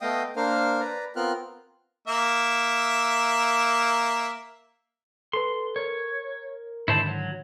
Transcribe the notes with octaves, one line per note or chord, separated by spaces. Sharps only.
A3 B3 D#5 F5 G5 D#6
A#3 D4 A#4 C5 F5 F6
B4 D5 A#5
B3 C4 F4 A#4 F6 F#6
A#3 E5
A4 B4 C6
A#4 C#5
G#2 D3 D#3 E4 C5 A5
F#3